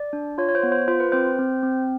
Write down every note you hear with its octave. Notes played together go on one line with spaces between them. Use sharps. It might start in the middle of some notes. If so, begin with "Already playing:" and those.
Already playing: D5
D4
F4 C#5
C#5
C5
B3
C5
F4 C5
B4
C4 C5
C4
C4